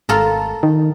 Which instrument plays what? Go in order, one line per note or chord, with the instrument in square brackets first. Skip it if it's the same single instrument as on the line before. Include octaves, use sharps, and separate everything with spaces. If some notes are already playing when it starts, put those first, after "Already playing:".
[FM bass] G#1 [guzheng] F4 A4 A#4
[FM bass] D#3